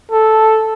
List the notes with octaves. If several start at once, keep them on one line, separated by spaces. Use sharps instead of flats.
A4